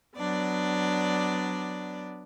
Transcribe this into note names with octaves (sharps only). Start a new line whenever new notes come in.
F#3 B3 D4 D5